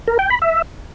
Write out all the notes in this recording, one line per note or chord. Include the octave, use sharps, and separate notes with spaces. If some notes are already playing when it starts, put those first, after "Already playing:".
A#4
G5
B5
E5